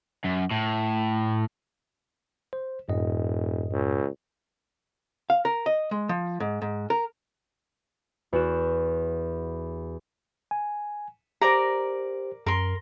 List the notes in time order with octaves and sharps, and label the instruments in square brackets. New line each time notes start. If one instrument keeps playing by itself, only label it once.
[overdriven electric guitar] F#2
A2
[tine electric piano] C5
[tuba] E1 [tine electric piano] F#2 A2 D#5
[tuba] C#2
[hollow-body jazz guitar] F5
A#4
D#5
G#3
F3
G#2
G#2
A#4
[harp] E2 F#4 E7
[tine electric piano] G#5
[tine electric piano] G4 C5 [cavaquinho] A#4 D5 A#5
[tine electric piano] F#2 [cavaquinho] A#4 C6